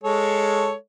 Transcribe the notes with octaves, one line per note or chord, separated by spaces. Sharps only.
G#3 A4 C#5